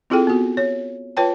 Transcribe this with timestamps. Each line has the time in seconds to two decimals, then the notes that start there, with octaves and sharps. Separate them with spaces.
0.10 C4 E4 F4 G#4 A4 G5
0.27 B3 F#4
0.57 C#5
1.17 F4 B4 C#5 G5 A5